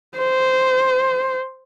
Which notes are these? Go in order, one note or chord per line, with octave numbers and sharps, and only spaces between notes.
C5